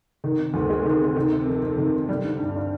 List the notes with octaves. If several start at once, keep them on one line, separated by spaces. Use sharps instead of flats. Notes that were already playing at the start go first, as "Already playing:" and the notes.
D#3
C3
D2
G#3
D#3
C3
D#3
C3
F2
F2
D#3
C3
G3
D3
G2
D4